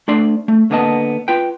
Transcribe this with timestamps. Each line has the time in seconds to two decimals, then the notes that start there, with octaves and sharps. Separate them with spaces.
0.08 A3 D4 D5 C6
0.48 A3
0.71 D3 A#3 B3 D#5 A5
1.28 F4 B4 G5